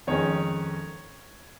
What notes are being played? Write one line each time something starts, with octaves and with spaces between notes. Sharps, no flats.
F2 D#3 G#3 C#4 C#5